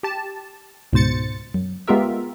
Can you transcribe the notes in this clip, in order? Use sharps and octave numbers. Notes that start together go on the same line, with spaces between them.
G4 A5
C#2 G#2 B2 C5 A6 C#7
F#2
G#3 B3 F4 G4 A#4 E5